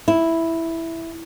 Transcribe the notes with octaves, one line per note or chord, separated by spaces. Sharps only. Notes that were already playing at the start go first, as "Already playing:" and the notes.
E4